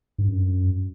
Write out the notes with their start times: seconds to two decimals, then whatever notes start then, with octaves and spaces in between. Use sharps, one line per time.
0.18 G2
0.28 F#2